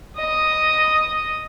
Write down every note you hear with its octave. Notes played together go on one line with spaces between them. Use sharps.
D#5 D#6